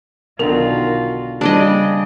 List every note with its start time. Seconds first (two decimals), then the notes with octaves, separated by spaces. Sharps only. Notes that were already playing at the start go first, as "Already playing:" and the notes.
0.39 B1 D3 D#3 F4 F#4 A#4 F7
1.41 C#3 G3 D4 D5 D#5